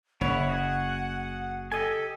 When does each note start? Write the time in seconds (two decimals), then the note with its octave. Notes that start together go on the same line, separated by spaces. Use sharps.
0.21 F#1 C#3 E4 C#5 F#5
0.49 F#4 G#4
1.72 G4 A4 D#5 G#5